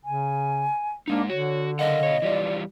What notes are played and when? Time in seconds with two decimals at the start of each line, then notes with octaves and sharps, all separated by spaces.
0.05 C#3 G#5
1.08 G#3 A#3 D4 D#4
1.29 D3 F#4 C#5
1.79 C#3 A#4 D#5 F5 F#5
2.03 B2 C#5
2.22 E3 G3 F4 D5